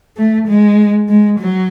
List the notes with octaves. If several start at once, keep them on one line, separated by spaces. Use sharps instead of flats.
A3
G#3
G#3
F#3